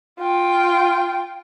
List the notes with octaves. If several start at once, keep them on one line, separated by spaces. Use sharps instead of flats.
F4 G5